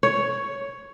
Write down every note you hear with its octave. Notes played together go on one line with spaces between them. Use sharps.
C#5